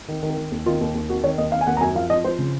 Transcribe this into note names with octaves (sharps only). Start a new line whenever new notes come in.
D#3
D#3
A#4
D#3
D#2
D#3 F4
D#2
D#2
D#3 F#4
D#3 C#5
D#2 D#5
D#3 F5
G#5
D#2 F#5
A#5
F#2 G#5
F3 F5
F3 D#5
F3 C5
C#3